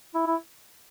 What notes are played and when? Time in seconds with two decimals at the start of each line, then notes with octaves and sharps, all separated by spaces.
0.15 E4
0.26 E4